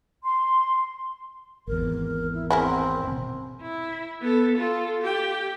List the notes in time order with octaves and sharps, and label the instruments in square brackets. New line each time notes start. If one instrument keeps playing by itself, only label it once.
[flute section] C6
[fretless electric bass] G#1 E2 [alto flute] A#4
[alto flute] E4
[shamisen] G#3 E4 A#4 [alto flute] C4
[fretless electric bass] B2 C4
[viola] E4
B3 A4
F4 A4
G4 G5